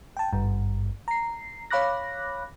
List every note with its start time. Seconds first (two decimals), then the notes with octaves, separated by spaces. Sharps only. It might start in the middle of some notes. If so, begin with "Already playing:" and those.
0.17 G5 A5
0.33 G#1 G2
1.08 A#5 C7
1.70 C#5 F5 B5 D6 F#6 A#6